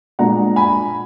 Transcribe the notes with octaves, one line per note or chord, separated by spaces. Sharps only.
A#2 G#3 D4 F#5 A#5
G#5 B5